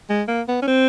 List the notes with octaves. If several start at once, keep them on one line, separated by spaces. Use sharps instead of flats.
G#3
A#3
B3
C#4
C4